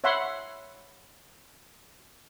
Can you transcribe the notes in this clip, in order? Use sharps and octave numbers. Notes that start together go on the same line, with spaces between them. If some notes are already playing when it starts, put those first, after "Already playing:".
C#5 E5 F#5 B5 C6